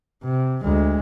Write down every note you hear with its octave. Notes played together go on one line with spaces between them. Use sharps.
C3
D2 G#3